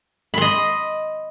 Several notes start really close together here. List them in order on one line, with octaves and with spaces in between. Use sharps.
B5 C6 D#5